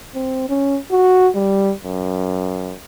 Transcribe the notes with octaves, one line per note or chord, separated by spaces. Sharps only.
C4
C#4
F#4
G3
F#2